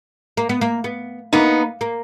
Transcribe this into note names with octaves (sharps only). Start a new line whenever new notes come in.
A#3
B3
A#3
B3
A#3 B3 D#4
A#3